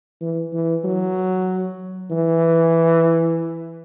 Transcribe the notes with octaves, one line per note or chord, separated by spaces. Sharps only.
E3
E3
F#3
E3